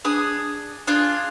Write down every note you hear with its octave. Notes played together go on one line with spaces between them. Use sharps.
D4 G#4 D#6
D4 F4 G#4